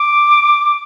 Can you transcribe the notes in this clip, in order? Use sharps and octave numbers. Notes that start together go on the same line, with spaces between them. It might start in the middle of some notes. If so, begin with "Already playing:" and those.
Already playing: D6